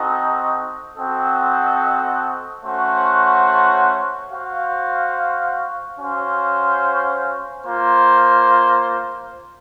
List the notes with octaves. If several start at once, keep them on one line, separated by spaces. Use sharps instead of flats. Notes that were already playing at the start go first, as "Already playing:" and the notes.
Already playing: C4 D#4 F#4 A4 D#5
C4 F#4 A4 D#5 F#5
A3 C#4 F#4 C5 F#5
F#4 C5 F5
C#4 F#4 C5 F5
A#3 F4 C5